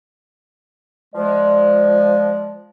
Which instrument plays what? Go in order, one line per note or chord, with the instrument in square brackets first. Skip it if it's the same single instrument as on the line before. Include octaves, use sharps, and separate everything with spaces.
[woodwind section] F3 G#3 [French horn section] D5